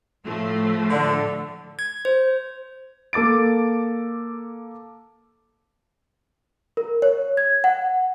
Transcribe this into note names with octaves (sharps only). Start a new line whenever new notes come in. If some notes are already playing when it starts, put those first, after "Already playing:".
A2 F3 A3
D3
G#6
C5
A#3 A4 D6 A6 D7
A#4
C#5
G#6
F#5